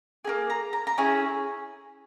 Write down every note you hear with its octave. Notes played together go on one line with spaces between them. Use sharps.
A#3 D#4 G#4
A#5
A#5
A#5
C#4 E4 G#4 G#5